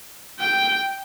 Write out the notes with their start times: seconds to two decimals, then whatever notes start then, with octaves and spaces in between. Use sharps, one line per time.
0.40 G5